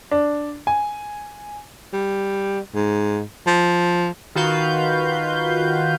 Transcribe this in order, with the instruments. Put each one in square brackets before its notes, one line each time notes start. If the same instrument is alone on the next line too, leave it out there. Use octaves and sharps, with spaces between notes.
[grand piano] D4
G#5
[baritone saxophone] G3
G#2
F3
[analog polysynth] D#3 F4 F#4 B4 F5 G6